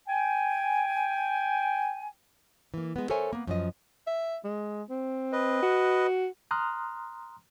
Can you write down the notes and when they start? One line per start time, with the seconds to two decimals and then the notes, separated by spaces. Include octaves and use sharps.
0.08 G5 G#5
2.74 E3 A#3
2.96 G#3 B3
3.10 A4 A#4 C5 C#5 E5 G#5
3.33 A#3 B3
3.47 F#2 F3 D#5
4.07 E5
4.45 G#3
4.90 C4
5.33 B4 D#5
5.63 F#4
6.51 A#5 C6 D#6 F6 F#6